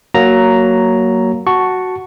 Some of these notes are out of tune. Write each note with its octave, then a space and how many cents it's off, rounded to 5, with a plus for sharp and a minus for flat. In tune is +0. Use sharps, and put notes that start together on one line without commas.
F#3 +10 A#3 +0 A#5 +0
F#4 +0 A5 +0 C#6 +0